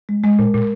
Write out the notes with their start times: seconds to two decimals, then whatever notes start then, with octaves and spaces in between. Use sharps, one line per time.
0.09 G#3
0.24 G#3
0.39 A#2
0.54 A#2